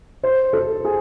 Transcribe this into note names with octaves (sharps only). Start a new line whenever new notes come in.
C5
A4
G#4